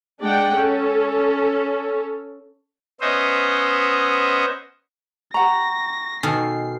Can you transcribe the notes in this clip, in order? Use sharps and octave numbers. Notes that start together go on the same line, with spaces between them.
G#3 D4 D5 F#5 G5
C#4 A4
B3 C#4 C5 D#5 E5
G4 F#5 A#5 C#6 A#6
B2 D#3 A4 G#5 F6 C7